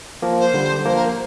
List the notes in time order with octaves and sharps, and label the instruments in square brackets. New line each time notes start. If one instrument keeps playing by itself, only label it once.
[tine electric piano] F3 A#3
[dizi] C5
[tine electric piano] D3 G3
[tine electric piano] F3 A#3 [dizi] C5
[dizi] A#4